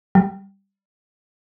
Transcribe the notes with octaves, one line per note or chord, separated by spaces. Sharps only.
G3